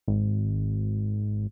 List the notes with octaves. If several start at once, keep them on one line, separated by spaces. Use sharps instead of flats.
G#1